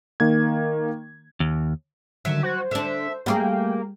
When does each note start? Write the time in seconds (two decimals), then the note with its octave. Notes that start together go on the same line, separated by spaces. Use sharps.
0.20 D#3 A#3 G#6
1.40 D#2
2.25 D3 D#3 F#3 E5
2.43 F#4 C5
2.71 D3 D4 E5
3.26 G3 A3 A#3 F4 G#4 G5